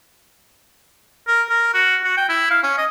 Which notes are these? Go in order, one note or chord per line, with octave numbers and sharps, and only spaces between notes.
A#4
A#4
F#4
F#4
G5
E4
F5
C#4
D#5